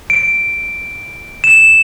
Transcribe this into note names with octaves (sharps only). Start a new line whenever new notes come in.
D7
E7